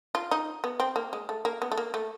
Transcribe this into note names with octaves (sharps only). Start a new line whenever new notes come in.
F4
D#4
B3
C4
A#3
G#3
A3
A#3
B3
A3
A#3
A3